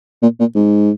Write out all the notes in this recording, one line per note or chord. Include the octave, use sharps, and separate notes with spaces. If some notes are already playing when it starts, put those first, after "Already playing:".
A#2
A#2
G#2